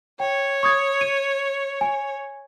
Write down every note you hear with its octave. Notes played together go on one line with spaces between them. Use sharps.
C#5 G5
C#6 D#6 G#6
D#7
G#5